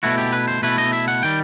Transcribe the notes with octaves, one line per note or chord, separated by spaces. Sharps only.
B2 A3 E4 F#4
G4
B4
C5
B2 A3 E4 B4
D#5
E5
F#5
D#3 G3 G5